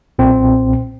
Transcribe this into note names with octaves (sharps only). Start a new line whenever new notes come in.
B1 A#2 C4